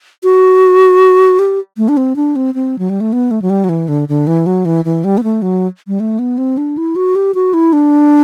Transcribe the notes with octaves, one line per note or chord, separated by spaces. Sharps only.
F#4
G4
A3
D4
C4
D4
C4
C4
F#3
G3
A3
B3
A3
F#3
G3
F#3
E3
D3
D3
E3
F#3
E3
E3
G3
B3
A3
F#3
G3
A3
B3
C4
D4
E4
F#4
G4
F#4
E4
D4